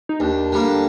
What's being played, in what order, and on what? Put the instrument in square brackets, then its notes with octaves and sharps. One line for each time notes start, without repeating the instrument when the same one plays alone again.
[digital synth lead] D#4
[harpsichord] D#2 [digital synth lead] D4
[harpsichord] D3 G3 A#3